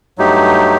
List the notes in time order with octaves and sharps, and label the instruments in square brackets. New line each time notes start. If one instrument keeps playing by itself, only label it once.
[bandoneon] G2 F#3 A3 D#4 G4